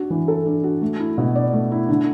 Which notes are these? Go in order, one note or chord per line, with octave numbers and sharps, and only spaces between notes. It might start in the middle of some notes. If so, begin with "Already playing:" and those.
Already playing: D4 F#4
E3
A4
D4
F#4
A3
E4
B2
D5
A3
E4
D3